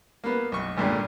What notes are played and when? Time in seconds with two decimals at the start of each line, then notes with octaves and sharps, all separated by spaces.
0.24 A#3 B3
0.52 B1 C#6
0.77 G#1 G2 A#2 D3 G3